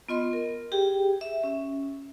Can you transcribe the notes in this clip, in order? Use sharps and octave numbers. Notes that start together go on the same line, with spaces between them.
B3 F4 D#5 C6
A#4
G4 G#4 G5
E5
C#4